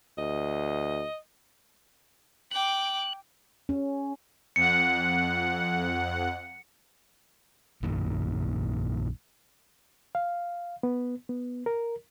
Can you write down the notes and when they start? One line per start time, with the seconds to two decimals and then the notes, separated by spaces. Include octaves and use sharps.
0.18 D2 D#5
2.51 G5 D6 F#6
3.69 C#4
4.56 F2 F#5 C#7
7.82 A#1 F#2 A#2 D#3
10.15 F5
10.83 B3
11.29 B3
11.66 A#4